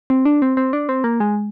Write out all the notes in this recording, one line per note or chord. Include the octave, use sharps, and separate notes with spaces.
C4
D4
C4
C4
D4
C4
A#3
G#3